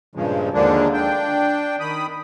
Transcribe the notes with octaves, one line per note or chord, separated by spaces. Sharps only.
G2 A#2 C#3 F3 G#3
D#2 D3 F3 G#3 A#3 D4
D4 G5
D#3 B5 D#6